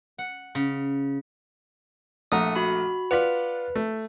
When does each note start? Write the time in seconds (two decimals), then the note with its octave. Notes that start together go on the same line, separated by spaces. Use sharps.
0.18 F#5
0.55 C#3
2.32 A#1 A3 F#5 A#5 D#6
2.56 F#4 B5
3.11 F4 B4 D5 F#5 B6
3.75 A3